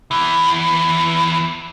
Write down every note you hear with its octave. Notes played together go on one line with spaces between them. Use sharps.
E2 E3